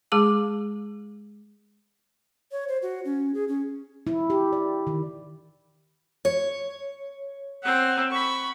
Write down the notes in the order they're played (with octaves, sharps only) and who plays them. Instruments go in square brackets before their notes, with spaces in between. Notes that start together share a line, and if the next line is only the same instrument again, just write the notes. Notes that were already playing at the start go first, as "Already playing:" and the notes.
[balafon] G#3 G#4 A5 D6
[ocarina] C#5
C5
F#4
C#4
G#4
C#4
[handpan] E4
G4
D5
D#3
[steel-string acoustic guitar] C#5
[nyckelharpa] C4 F#5
B5 C#6